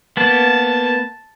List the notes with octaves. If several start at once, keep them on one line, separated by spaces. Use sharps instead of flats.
A#3 B3 A5